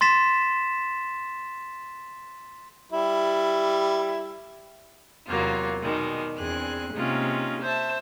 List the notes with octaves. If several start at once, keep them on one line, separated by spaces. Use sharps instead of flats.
C6 A6 B6 E7
G3 E4
E2 C3 F#3 A#3 F4
B2 D#3 G3 G#3
E2 C4 D4 G#4 G#5 F#6
C3 G#3 A#3 C#4 D#4 F4
C5 E5 A5